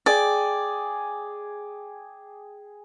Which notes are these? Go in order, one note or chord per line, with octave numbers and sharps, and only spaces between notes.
G#4 D5 G5